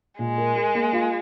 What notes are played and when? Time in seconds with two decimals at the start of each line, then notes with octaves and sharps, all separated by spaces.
0.19 A#2 G#3
0.38 A#4
0.56 A#4
0.75 A#3
0.93 F4